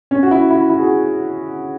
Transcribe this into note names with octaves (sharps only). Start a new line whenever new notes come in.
C#4
F#4
E4
E4
E4
G#4
F#4